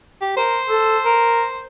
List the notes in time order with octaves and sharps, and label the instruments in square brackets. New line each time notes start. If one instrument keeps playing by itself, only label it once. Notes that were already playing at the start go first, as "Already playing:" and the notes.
[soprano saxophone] G4
[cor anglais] A#4 [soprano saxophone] C5
[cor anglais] A4
A#4